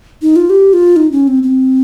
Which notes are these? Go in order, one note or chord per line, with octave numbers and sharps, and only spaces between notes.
D#4
F4
G4
F4
D#4
C#4
C4
C4